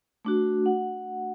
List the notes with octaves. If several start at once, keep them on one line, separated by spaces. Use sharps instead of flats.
A3 D4 F#4
F#5